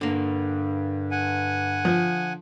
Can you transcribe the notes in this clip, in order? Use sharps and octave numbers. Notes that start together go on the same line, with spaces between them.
G2 D3 A#3
F#5 G#5
F3